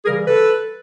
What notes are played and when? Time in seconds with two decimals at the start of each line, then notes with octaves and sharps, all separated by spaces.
0.05 C#3 E3 G3 G#4 A#4
0.27 A4 B4